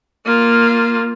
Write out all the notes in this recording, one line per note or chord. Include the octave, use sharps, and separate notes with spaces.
A#3 F4